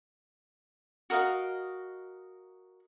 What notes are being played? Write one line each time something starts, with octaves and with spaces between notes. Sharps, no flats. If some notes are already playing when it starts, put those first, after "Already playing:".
F#4 A#4 D#5 F5